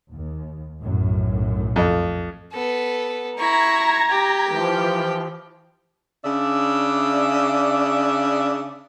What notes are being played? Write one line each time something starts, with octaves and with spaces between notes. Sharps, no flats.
D#2
B1 F#2 A2
F2
B3 A4
E4 A#5 C#6 G#6 A#6
G4
E3 F3
C#3 D4 D5 E5